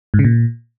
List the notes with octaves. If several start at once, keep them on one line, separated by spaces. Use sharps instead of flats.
G#2
C#3
A#2